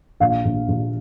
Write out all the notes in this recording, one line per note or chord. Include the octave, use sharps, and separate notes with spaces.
A#1 F5
A#1
A#1